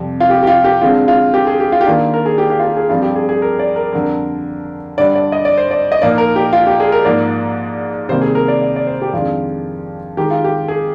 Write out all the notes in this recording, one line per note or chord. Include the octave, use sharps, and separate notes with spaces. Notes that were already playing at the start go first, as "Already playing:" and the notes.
Already playing: F2 C3 G3
F4
G4
G4
F4
G4
D3 G#3 C4 F4
F4
G4
G#4
G4
F4
G4
D#3 A#3 D4 F4
A#4
G#4
G4
G4
F4
G4
G#4
G2 F3 C4 F4
G4
G#4
G#4
A#4
D5
A#4
F2 D3 G3 A#4
G2 D3 G3 D5
D5
D#5
D5
C5
D5
D#5
A#2 F3 A#3 D#4 D5
A#4
G4
F4
G4
G#4
A#4
G#2 F3 A#3 D5
C3 D#3 G3 A#3 C5
G#4
A#4
D5
D5
D5
C5
G4
F2 D#3 G#3 D4 F4
D#3 G#3 D#4 G4
F4
G4
G#4